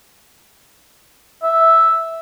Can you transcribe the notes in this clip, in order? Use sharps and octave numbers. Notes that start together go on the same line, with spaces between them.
E5